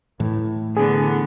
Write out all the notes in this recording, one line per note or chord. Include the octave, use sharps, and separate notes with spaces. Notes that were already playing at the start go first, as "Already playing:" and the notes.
A2 E3
D3 B3 G#4